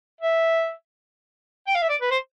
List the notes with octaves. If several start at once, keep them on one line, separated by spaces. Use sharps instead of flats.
E5
G5
F5
E5
D5
B4
C5